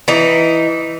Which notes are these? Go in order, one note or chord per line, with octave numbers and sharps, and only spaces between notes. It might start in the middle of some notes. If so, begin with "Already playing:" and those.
E3 D#4